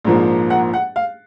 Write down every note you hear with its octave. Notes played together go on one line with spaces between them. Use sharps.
A#1 G#2 F3 A#3
F#5
F#5
F5